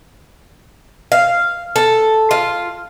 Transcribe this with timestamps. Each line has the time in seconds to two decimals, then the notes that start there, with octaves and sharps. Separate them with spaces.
1.12 F5
1.76 A4
2.31 F4